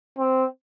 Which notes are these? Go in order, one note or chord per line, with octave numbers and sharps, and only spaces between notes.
C4